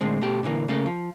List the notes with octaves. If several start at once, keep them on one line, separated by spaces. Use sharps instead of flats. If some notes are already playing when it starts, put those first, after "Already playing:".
A2 D3 G#3 C4
B2 A3 G4
A#2 D3 E3 A#3
C#3 A3 A#3 A4
F3